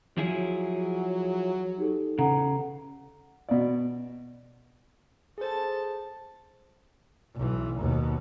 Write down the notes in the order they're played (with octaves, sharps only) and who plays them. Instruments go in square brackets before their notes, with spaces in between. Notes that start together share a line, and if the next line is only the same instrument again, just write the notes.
[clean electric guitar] F3 E4 G#4 [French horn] F#3
[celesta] D#4 G4 A4
[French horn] E2 [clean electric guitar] C#3 [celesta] A4 F#5 A#5
[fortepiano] B2 D5
[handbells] G#4 C5 [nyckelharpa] A4 A5
[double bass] B1 E3
D#2 B2